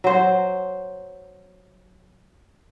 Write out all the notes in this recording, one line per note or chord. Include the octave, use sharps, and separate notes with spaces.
F#3 C5